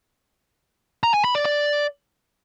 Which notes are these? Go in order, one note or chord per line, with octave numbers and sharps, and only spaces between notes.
A#5
G#5
B5
D5
D5